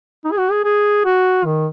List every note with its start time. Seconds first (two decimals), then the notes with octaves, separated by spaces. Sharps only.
0.25 D#4
0.32 G#4
0.38 F#4
0.51 G#4
0.65 G#4
1.05 F#4
1.45 D#3